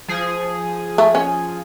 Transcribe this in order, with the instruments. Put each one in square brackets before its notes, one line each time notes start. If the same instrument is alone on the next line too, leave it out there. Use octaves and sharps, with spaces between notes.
[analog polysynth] F3 G#4
[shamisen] A3
C#4